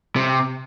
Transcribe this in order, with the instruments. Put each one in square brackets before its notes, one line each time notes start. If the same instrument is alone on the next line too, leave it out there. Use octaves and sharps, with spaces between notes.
[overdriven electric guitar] C3